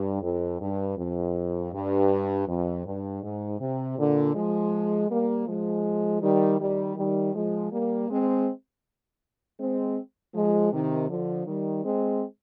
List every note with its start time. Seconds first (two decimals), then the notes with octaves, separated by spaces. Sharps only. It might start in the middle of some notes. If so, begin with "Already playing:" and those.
Already playing: G2
0.22 F2
0.60 G2
0.97 F2
1.73 G2
2.48 F2
2.85 G2
3.23 G#2
3.59 C3
3.97 A#2 D3
4.35 F3 G#3
5.10 G3 A#3
5.47 F3 G#3
6.22 D#3 G3
6.60 D#3 G3
6.97 D#3 G3
7.35 F3 G#3
7.72 G3 A#3
8.10 G#3 C4
9.59 G#3 C4
10.34 F3 G#3
10.73 C3 D#3
11.10 D3 F3
11.47 D#3 G3
11.84 G#3 C4